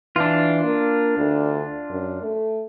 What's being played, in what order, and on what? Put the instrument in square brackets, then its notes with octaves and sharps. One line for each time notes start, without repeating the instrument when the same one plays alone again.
[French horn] E3 [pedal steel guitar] D4 F4
[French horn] A#3
D2
F#2
A3